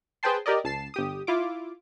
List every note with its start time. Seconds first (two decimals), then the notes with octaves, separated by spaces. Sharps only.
0.23 G#4 B4 C5 G5 A5 C6
0.46 G4 A#4 D5 D#5
0.64 C#2 A5 C7 E7
0.94 G1 G4 D#6
1.27 E4 F4 D6